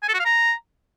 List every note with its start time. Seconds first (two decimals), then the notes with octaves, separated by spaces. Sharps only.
0.03 G#5
0.08 A4
0.14 F#4
0.20 F5
0.25 A#5